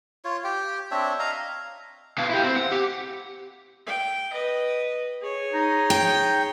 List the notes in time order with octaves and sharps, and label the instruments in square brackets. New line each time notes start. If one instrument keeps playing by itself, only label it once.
[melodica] F4 C#5
G4 G5
C4 D4 C#5 E5
D#5 F5 A#5
[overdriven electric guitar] B2 F5
E4 G4
C4
F#5
G4
[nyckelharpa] G5
B4 D#5
G#4 C#5
[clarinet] D#4
[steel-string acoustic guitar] G5